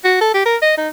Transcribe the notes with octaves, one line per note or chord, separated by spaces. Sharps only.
F#4
A4
G4
A#4
D#5
D#4